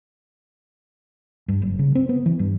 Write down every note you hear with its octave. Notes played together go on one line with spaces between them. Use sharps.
G2
F#1
C#3
C4
B3
E3
G2